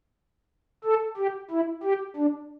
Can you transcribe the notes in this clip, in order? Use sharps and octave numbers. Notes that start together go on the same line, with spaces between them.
A4
G4
E4
G4
D4